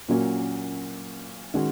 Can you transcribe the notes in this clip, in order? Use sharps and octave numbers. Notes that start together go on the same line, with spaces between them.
A#2 F#3 A#3 C#4 F#4
D#3 G#3 C#4 F#4